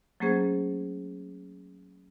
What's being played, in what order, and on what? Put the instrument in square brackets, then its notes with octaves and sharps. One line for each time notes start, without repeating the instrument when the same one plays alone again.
[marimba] F#3 A3 A#3 C#4 G#4 C5